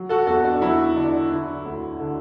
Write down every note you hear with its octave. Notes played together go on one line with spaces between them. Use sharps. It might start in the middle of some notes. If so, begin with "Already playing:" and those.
Already playing: F#3
F#4 A4
E2 F#4 A4
D4 F#4
F#3 E4
D3 D4
D3 E4
D2
D3